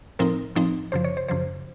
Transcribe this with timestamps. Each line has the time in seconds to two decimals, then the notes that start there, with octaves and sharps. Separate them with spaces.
0.19 A2 F3 C4 D#4 A#4
0.55 A2 F3 C4 D#4
0.92 F#2 C#3 F3 C5
1.04 C#5
1.17 C5
1.28 F#2 C#3 F3 C5